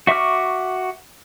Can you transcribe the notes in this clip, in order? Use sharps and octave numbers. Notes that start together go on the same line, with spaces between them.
F#4 E5 C#6 D6 F6